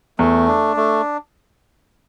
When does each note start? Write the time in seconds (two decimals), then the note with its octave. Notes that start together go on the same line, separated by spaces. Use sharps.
0.19 E2 A3
0.48 D4
0.77 A3